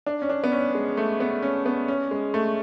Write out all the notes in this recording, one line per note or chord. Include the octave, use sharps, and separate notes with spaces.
D4
C#4
D4
B3
C#4
G#3
A3
B3
C#4
B3
C#4
G#3
A3